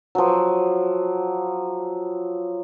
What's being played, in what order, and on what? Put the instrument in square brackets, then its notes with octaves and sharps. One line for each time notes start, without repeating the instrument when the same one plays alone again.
[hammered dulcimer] F3 F#3